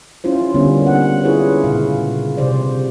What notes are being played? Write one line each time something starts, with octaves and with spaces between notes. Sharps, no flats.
C#4 E4 F4 C5
D3 G3 A#3 B3 C#4
F#5
C#4 E4 F4 G#4 B4 C#5
A#2 C#3 F5
C3 C5 D5